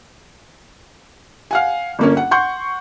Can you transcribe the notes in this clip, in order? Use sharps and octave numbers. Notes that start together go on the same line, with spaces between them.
F5 F#5 G#5
G1 A#3 C#4
F#5
F#5 C6 C#6 G6